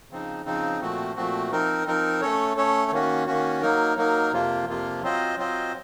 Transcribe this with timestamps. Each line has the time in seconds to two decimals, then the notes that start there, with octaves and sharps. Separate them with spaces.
0.11 C#3 F3 C4 D#4
0.46 C#3 F3 C4 D#4
0.81 A#2 F3 A3 C4 F#4
1.16 A#2 F3 A3 C4 F#4
1.51 F3 C4 D#4 A#4
1.86 F3 C4 D#4 A#4
2.21 A3 C#4 A4 C#5
2.57 A3 C#4 A4 C#5
2.91 D#3 A#3 C#4 F#4
3.27 D#3 A#3 C#4 F#4
3.62 F#3 A#3 D#4 A#4
3.97 F#3 A#3 D#4 A#4
4.32 F2 C3 F3 A#3 F4
4.67 F2 C3 F3 A#3 F4
5.02 F#3 C4 F4 C5 D#5
5.38 F#3 C4 F4 C5 D#5